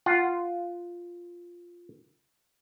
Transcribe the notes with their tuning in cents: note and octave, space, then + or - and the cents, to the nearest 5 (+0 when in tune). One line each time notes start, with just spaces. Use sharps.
F4 +0 F#5 +10